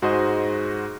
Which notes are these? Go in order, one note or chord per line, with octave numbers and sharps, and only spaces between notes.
G#2 F#4 G#4 C5 D#5